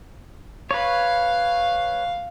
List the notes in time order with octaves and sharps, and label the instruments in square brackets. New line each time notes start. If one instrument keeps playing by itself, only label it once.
[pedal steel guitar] B4 C#5 [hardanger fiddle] F5